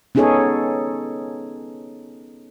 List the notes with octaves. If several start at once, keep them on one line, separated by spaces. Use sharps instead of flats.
B3 C#4 D#4 G#4 A4 C#5